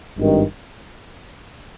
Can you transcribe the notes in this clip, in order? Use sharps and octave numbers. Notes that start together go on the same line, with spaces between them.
G#1 G2 D#3